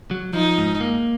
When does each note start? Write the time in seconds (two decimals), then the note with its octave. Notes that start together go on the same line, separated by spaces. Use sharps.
0.11 F#3
0.33 F3 D#4
0.58 G#2
0.81 A#3